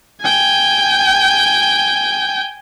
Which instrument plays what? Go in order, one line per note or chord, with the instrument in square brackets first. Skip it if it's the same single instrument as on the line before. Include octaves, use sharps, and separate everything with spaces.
[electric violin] G5 G#5